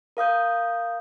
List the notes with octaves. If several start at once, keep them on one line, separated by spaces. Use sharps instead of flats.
A#4 F5 D#6 G6